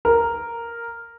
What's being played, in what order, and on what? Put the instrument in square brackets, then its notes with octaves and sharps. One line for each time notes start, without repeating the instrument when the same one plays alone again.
[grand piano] A#4